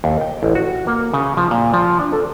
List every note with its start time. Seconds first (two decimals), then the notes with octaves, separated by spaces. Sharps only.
0.04 D#2
0.21 G5
0.43 A1
0.55 F#4
0.87 A#3
1.14 C#3
1.37 F3
1.51 A#2
1.74 F3
1.99 D4
2.13 A4